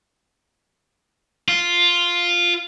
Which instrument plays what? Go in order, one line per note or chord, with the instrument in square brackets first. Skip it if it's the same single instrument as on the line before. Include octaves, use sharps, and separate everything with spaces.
[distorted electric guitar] F4